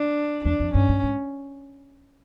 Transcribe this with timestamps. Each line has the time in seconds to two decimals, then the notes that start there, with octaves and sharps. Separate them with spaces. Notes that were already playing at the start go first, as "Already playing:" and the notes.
Already playing: D4
0.45 E2 D4
0.60 F2
0.74 G2 C#4
0.89 G2
1.03 G#2